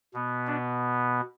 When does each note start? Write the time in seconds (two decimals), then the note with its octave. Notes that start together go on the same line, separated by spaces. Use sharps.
0.14 B2 B3
0.47 D4